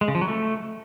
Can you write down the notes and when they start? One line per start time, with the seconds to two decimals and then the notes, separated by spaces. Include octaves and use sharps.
0.01 G#3
0.08 C#3
0.15 F3
0.21 F#3
0.28 A3